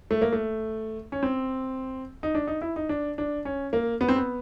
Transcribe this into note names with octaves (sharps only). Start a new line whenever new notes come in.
A3
A#3
A3
C#4
C4
D#4
D4
D#4
E4
D#4
D4
D4
C#4
A#3
B3
C4
B3